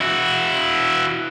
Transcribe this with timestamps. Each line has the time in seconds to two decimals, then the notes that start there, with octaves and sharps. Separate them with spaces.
0.01 E4 F#4